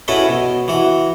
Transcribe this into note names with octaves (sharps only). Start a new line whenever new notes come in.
C#4 E4 F#4 A4 B4 D#5
B2
E3 F#4